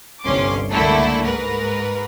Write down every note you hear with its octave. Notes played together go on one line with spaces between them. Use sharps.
G1 C2 G2 C#4 C6 D6
C#2 D3 A3 A#3 E4 A4
G#2 A#4 B4